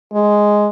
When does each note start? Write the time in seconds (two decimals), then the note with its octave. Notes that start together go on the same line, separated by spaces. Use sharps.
0.13 G#3